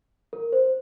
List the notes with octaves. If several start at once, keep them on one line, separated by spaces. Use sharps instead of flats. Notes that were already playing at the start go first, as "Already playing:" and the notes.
A#4
C5